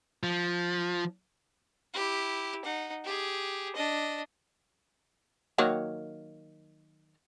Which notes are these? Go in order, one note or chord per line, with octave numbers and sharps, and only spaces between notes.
F3
E4 G4
D#4 F#5
G4 G#4
D4 D#5
D#3 F#3 A#3